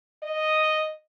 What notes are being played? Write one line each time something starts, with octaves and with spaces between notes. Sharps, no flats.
D#5